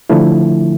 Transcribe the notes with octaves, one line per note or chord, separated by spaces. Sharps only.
D3 F3 A3 E4